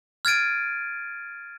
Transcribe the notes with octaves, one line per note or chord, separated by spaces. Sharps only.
F6 G#6 A6 D7 D#7